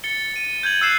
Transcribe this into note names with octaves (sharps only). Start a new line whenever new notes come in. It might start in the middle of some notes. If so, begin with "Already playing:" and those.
A6 C#7 G7
D#7
G6 G#6 F#7
E6 F#6 C7 E7